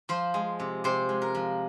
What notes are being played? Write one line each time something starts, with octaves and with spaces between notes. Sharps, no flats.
F3 C5
G#3
C3
C3 C5
G#3
A#4
F3